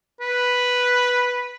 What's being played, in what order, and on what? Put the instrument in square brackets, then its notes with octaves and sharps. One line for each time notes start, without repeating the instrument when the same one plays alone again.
[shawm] B4